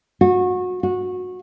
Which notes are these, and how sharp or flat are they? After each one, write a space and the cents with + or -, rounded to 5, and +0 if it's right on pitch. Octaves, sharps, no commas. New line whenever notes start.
F#4 -25
F#4 -20